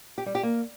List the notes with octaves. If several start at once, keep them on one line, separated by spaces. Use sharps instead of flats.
G4
G3
G4
A#3